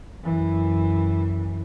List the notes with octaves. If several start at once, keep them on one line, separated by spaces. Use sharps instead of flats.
F#2 E3